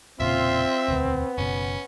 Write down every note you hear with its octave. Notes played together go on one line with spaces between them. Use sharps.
E1 A#2 C#3 C4 F4 E5 C6
E1 D2 B3
F#1 B2 C#4